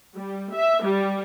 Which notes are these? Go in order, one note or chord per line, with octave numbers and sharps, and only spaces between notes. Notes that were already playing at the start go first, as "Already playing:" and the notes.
G3
E5
G3